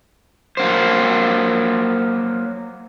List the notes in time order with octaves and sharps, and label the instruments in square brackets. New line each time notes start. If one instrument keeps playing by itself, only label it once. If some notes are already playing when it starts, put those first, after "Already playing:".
[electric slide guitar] F#3 A#3 C5